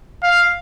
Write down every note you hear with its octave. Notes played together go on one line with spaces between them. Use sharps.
F5